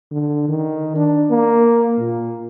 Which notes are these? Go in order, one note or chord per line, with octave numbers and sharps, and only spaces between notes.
D3
D#3
D4
A#3
A#2